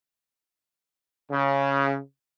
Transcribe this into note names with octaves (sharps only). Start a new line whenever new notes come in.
C#3